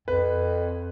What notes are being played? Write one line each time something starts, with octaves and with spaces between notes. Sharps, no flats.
F2 B4